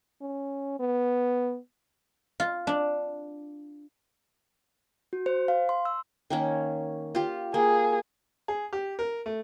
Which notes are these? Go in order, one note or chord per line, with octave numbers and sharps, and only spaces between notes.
C#4
B3
F4
D4
F#4
C5
F5
C6
E6
D#3 A#3 C#4
F4 G4
A#3 G#4
G#4
G4
A#4
A3